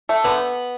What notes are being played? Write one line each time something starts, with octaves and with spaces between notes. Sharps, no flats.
A3
D3 B3 B4